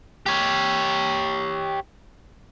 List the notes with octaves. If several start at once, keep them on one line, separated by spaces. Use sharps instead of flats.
G4 C#5